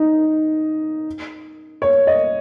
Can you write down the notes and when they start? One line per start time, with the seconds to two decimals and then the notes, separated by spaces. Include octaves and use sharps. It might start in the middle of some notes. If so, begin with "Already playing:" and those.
Already playing: D#4
1.82 C#5
2.07 D#5